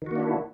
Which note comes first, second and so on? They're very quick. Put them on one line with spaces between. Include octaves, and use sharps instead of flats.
D#3 F#4 A#3 D4 E4